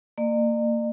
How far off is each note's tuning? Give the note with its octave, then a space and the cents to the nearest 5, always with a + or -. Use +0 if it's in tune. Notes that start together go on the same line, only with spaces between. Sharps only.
A#3 -25 D5 +45